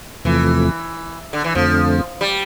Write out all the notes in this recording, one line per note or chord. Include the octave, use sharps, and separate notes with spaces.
E2 C3 E3 F3 A3
D3
E3
F2 D3 F3 A3 C4
G3